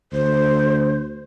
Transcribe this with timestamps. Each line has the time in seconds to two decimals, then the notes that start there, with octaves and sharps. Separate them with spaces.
0.13 D2 C5